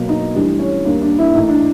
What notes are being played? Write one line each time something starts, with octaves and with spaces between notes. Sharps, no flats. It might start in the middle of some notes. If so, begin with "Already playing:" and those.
Already playing: B2 F#3 A#3
D#4
A2 E3 G3 D4
C#4
D#2 D#3 G3 A#3 D4
D4
E4
A2 E3 A3 D#4
D4